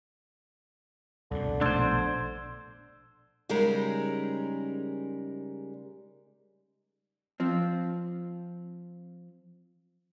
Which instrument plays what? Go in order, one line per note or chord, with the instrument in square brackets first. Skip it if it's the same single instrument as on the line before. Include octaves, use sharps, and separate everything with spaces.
[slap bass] C2 F2 B2 [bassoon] D3
[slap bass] A#1 B2 A3 [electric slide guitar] D4 C5 [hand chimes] C6 E6 G#6
[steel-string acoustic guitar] C#3 G3 G#3 D#4 A#4
[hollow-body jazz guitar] F3 C4